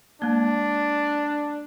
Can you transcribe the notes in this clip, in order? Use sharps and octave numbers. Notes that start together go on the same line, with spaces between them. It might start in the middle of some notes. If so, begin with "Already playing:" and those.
G#3 A#3 D4